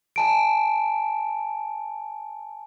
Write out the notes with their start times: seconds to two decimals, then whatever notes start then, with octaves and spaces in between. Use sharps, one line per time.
0.16 G#5 A5 D7